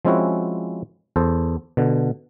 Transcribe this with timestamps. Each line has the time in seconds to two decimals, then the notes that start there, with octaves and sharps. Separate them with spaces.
0.05 F3 G#3 C4 C#4 E4 F#4
1.16 E2 A4 C5
1.77 B2 D3